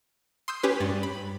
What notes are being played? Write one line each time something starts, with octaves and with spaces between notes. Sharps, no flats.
C6 D#6 E6 G6
C#4 G4 B4
G2 A6
B5